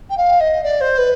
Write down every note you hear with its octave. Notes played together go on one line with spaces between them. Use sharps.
G5
F5
D#5
D5
C5
B4